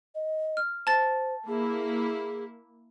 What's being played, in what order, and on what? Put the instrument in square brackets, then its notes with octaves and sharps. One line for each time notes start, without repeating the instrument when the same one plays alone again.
[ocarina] D#5
[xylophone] F6
[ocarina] C5 [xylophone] A5 A6
[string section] A#3 E4 [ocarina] G#4